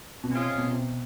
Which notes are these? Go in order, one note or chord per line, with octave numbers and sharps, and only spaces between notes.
B2
C3 G#3 C#4 F4 G#4
C3
B2
C3